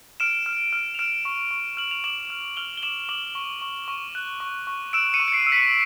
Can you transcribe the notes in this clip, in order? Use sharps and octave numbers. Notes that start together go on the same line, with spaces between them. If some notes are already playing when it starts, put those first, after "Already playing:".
F6 D7 E7
F6
F6
F7
F6 D7 E7
C#6
C#6
F6 F#7
F7
D6 E7 F#7
F6
F6 F7 G7
G7
D6 E7 F#7
D6 E7 F#7
C#6
C#6
C#6
F#6
C#6
C#6
E6 D7 E7
C#7 D#7
C#6
C#7
C7 D7
E6
B6 C#7